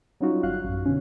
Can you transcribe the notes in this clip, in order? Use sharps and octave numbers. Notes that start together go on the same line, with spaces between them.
F#3 G3 C#4 D#4 F4 F#4
G1 F#4 F5 F#6
A1 F#2
B2 D3 C#4